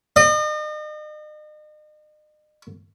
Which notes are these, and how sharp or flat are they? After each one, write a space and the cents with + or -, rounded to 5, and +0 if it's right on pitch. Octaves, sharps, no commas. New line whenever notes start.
D#5 -40